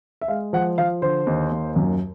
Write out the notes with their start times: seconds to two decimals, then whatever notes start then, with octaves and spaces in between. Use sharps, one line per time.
0.21 E5
0.28 G#3 F5
0.53 F3 F#5
0.78 F3 F5
1.02 D3 C5
1.27 D#2
1.51 D#2
1.76 F#2